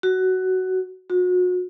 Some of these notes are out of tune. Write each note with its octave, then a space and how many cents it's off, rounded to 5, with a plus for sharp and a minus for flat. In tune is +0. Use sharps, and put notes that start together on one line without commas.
F#4 +10
F#4 -35